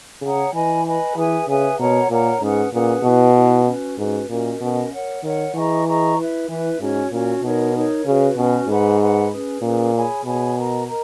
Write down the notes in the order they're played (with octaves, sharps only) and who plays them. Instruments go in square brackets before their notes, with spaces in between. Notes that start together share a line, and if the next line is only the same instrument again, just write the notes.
[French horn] C#3 [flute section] G#4 C#5 F#5 A#5
[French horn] E3 [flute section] B4 D#5 G#5 B5
[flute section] B4 D#5 G#5 B5
[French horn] E3 [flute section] G#4 B4 E5 G#5
[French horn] C#3 [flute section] G#4 B4 E5 G#5
[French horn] B2 [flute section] A#4 C#5 F#5 A#5
[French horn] A#2 [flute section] A#4 C#5 F#5 A#5
[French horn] G#2 [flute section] C#4 G#4 B4 F#5
[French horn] A#2 [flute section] C#4 G#4 B4 F#5
[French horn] B2 [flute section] E4 B4 D#5
[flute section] E4 B4 D#5
C#4 F#4 B4
[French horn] G#2 [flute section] C#4 F#4 B4
[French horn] A#2 [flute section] C#4 F#4 A#4 D#5
[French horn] B2 [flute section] C#4 F#4 A#4 D#5
[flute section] A#4 C#5 F#5
[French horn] D#3 [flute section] A#4 C#5 F#5
[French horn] E3 [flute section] G#4 D#5 A#5 C#6
[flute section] G#4 D#5 A#5 C#6
E4 B4 E5
[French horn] E3 [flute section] E4 B4 E5
[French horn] G#2 [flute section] C#4 F#4 C#5
[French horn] A#2 [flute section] C#4 F#4 C#5
[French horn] B2 [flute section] D#4 A#4 C#5
[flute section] D#4 A#4 C#5
[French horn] C#3 [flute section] C#4 F#4 B4
[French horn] B2 [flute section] C#4 F#4 B4
[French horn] G#2 [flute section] B4 F#5 B5
[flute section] B4 F#5 B5
C#4 G#4 B4
[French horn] A#2 [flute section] C#4 G#4 B4
[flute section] G#4 C#5 G#5 B5
[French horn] B2 [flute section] G#4 C#5 G#5 B5
[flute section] A#4 D#5 A#5
A#4 D#5 A#5